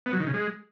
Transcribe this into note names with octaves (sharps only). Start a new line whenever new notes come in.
B3
F#3
D#3
C#3
G#3